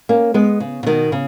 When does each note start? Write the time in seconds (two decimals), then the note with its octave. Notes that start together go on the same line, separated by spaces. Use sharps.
0.09 A#3 C#4
0.34 G#3 B3
0.60 C#3
0.83 C#3
0.86 B2 D#3
1.12 C#3